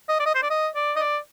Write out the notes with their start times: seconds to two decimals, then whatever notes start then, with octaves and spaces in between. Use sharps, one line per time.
0.09 D#5
0.20 D5
0.26 D#5
0.35 C5
0.43 D5
0.50 D#5
0.75 D5
0.96 D#5
1.00 D5